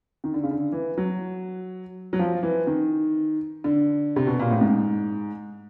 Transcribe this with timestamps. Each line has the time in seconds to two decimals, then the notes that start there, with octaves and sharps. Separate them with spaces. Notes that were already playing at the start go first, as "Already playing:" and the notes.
0.24 D#3
0.34 D3
0.43 C#3
0.51 D3
0.72 E3
0.97 F#3
2.13 F#3
2.19 F3
2.43 E3
2.67 D#3
3.64 D3
4.16 C3
4.27 B2
4.39 A#2
4.50 A2
4.61 G#2